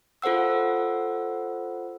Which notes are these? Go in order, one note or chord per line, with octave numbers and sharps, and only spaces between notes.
F4 A4 C5 F#5 E6